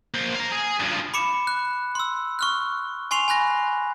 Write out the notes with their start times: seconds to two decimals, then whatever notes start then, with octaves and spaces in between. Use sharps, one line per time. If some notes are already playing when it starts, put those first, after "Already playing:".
0.14 A#3 C5
0.35 F5 A#5
0.52 G#4
0.80 G2 F3
1.14 B5 D6 C#7 E7
1.47 F#6
1.95 C6 E6
2.39 C#6 F6 F#6
3.11 G#5 C6 C#6 C7 F7
3.28 G#5 B5 F#6 A#6